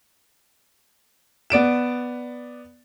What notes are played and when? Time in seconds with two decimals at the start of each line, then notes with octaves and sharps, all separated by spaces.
1.50 B3 D5 D7 E7